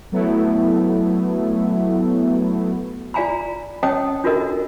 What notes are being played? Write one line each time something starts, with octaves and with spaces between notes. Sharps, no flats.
F#3 A3 B3 E4
F4 D5 F5 G#5 A#5 B5
C#4 C#5 D#5 G5 A5 D#6
D4 F4 F#4 A4 A#4 D#5